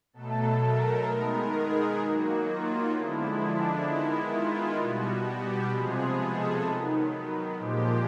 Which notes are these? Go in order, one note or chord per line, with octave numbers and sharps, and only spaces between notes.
B2 F#3 A3 A4
A#4
D#3 G#3 B3
G#4
D#3 F#3 A#3 F#4
F4
D3 F3 G#3 B3 E4
D4
D#3 G#3 B3 E4
F4
B2 G3 B3 F#4
G4
C3 F3 G#3 B3 G#4
A4
D#3 F#3 B3
A#2 F3 G#3 G4